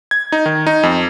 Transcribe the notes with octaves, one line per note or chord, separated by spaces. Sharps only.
G#6
D#4
D#3
D#4
F2